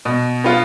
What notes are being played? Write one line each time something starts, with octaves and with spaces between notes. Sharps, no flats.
B2
B3 F4